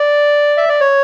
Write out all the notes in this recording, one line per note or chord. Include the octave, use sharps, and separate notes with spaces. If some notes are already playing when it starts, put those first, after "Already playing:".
Already playing: D5
E5
D5
C#5